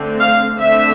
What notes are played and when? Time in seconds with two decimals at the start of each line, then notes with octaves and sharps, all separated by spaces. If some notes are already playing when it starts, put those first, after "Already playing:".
Already playing: D3 A3 C4
0.20 F5
0.59 D3 A3 C4 E5